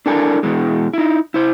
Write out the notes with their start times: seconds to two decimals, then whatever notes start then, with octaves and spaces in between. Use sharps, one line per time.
0.06 D4 E4 A4 A#4 G#5
0.43 B2 E3 G#3
0.93 D#4 E4
1.34 E4 C5